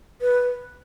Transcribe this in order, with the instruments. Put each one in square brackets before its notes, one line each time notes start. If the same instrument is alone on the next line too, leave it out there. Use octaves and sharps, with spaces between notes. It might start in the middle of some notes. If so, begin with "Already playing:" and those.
[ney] B4